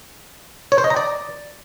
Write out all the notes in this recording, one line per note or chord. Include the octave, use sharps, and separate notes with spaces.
C#5
C5
D#5
A#5
D5